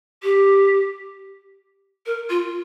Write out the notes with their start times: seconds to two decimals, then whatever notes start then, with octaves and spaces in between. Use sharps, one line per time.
0.23 G4
2.06 A#4
2.29 F4